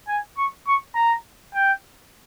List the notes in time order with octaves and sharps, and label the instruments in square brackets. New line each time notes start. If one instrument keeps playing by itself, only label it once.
[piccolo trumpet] G#5
C#6
C#6
A#5
G5